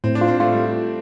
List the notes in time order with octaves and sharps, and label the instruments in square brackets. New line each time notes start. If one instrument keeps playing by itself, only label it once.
[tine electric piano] A2 [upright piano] C4
[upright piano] D4
[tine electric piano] F4
[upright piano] C4
[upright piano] A3 [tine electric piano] F4
[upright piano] G3